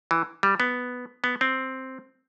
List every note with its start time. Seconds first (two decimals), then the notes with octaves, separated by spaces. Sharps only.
0.11 E3
0.43 G3
0.60 B3
1.24 B3
1.41 C4